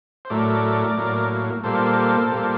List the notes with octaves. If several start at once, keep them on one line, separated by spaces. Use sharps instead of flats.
C5
A2 F#3 A3 A#4 D5
A2 F#3 A#3
A#2 G3 A#3 A4 C5
A#2 G3 A#3